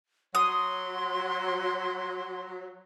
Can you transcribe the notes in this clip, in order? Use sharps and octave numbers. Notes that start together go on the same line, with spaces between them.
F#3 C6 D#6